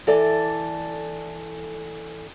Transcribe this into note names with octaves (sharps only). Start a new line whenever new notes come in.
E3 A4 D5